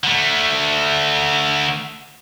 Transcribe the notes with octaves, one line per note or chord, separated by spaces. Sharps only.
D3 A3